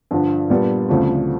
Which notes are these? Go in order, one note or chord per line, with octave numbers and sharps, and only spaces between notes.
G2 D3 F3
A#2 G3 B3 D4 G4
D2 C#3 F3 A3 C4